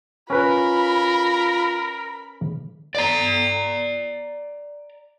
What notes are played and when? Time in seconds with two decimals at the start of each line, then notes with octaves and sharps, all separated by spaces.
0.30 C#4 F4 A#4 B4 B5
2.95 D5 A#5